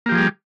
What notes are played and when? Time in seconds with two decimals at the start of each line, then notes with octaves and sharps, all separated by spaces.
0.06 A#3
0.09 G4
0.12 F3
0.15 G#4
0.18 G3